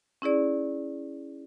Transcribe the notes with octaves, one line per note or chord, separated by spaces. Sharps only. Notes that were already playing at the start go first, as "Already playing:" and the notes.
C#4 E4 G#4 D5